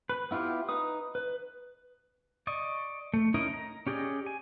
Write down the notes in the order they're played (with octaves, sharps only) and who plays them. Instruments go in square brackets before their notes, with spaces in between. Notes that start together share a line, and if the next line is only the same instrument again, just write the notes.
[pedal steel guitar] B4
B3 E4 F4 G4
D#4 B4 D#6
B4
D5 D#5 C#6
A3
C#4 D#4 E4 A#4 D#5
A#5
C#4 G4 G#4 D5 D#5
G#5